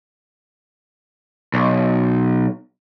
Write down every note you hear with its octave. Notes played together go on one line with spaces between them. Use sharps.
B1